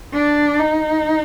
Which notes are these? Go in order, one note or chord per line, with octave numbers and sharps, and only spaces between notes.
D4
D#4